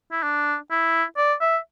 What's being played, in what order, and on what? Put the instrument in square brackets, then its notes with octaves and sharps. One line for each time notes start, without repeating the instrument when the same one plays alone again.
[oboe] E4
D4
E4
D5
E5